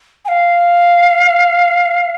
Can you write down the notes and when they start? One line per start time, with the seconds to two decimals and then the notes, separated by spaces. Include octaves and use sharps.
0.25 G#5
0.28 F5